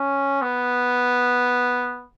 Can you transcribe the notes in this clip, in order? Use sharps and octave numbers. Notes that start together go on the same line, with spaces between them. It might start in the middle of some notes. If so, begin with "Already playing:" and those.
Already playing: C#4
B3